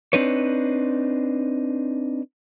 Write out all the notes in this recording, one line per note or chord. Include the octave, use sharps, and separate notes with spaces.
C4 D4 D#4 B4 C#5